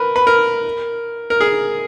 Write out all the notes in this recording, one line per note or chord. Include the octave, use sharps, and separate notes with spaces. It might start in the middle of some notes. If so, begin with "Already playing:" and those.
Already playing: A#4 B4
B4
A#4
A#4
G#4